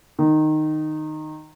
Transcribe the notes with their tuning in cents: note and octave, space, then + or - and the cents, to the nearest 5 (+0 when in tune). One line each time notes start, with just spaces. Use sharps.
D#3 -10